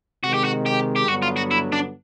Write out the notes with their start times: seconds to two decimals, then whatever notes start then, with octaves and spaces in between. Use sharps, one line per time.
0.24 C3 D#3 G#3 F#4
0.34 G4
0.45 F#4
0.66 G4
0.96 G4
1.08 G2 D3 F#3 B3 F#4
1.22 F4
1.37 F#4
1.51 E4
1.72 D4